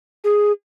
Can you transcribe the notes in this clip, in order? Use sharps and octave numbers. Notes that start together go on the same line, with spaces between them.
G#4